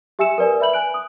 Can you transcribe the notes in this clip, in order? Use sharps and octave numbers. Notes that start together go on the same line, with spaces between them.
G4 E5 G#5 E6 C#7 E7
A#4 B4 D5 G#5
B4 E5 B5 G6 F#7
G#5 F#6 D7
D#6